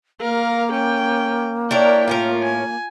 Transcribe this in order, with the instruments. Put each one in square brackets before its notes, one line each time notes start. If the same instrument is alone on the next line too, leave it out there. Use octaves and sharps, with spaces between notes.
[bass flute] A#3 [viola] A#4 F5
[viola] C#4 G5
[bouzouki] D4 E4 A#4 [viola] C#5 G5
[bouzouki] A2 C#4 A#4 [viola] F4
[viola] G#5